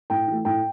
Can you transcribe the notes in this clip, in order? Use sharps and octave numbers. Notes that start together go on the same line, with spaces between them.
A2 G5
E3 A3
A2 G5